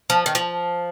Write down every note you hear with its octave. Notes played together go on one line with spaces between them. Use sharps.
F3
D#3
F3